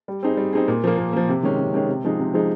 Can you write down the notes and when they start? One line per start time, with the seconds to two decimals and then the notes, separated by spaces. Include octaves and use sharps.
0.08 G3
0.23 C4 D#4 G#4
0.37 G3
0.53 C4 D#4 G#4
0.68 A#2
0.84 F3 A#3
0.98 A#2
1.13 F3 A#3
1.29 C3
1.43 D#3 G#3 C#4
1.59 C3
1.74 D#3 G#3 C#4
1.89 C3
2.04 F3 G#3 D#4 G#4
2.19 C3
2.34 F3 G#3 D#4 G#4